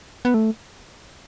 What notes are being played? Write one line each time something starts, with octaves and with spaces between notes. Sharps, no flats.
B3
A3